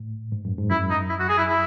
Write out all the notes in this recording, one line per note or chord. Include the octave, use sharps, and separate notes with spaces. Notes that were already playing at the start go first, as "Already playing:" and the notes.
Already playing: A2
G#2
F#2
G#2
F#2 E4
D#4
E4
F#4
G#4
E4
E4